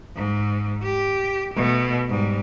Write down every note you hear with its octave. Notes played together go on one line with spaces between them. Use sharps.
G#2
G4
B2 A3
G#2 G3